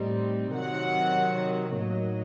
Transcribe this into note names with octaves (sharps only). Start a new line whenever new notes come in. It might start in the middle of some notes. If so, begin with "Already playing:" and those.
Already playing: A2 G3 C4 D#4
C3 D#3 F#3 F#5
A2 F#3 A#3 D#4 D#5